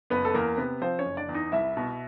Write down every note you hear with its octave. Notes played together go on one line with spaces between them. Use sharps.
F#1 B3 B4
A4
E2 A#3 A#4
C3 B3 B4
F3 C4 C5
C#4 C#5
F#1
D4 D5
E2
D#4 D#5
C2 E4 E5
B2